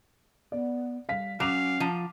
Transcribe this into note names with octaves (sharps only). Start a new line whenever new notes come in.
B3 D5
G3 F5 B6
F#3 C#4 F5 D6 F7
F3 A#5